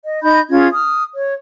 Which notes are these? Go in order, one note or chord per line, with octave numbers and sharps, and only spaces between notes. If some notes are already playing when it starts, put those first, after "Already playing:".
D#5
D#4 D#5 B5 G6
C#4 F4 G#4 G#6
D#6 F6
C#5